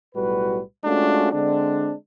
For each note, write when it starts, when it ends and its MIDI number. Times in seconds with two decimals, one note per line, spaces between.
0.15 0.60 35
0.15 0.60 45
0.15 0.60 55
0.15 0.60 66
0.15 0.60 71
0.85 1.29 56
0.85 1.29 57
0.85 1.29 61
0.85 1.29 62
0.85 1.29 65
0.85 1.29 66
1.33 1.93 50
1.33 1.93 56
1.33 1.93 60
1.33 1.93 62